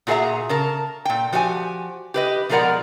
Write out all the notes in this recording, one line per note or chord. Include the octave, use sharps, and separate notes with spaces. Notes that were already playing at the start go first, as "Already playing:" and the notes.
A#2 F#4 G#4 A4 E5 A#5
C#3 A#4 A5
A#2 G5
F3 F#4 G4 D#5 G#5
G4 B4 D#5
B2 F3 G#3 A#4 D5 F#5